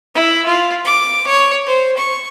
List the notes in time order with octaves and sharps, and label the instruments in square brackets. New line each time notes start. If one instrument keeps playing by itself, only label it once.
[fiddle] E4
F4
D6
C#5
C5
C#6